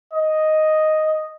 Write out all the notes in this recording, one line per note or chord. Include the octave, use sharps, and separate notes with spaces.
D#5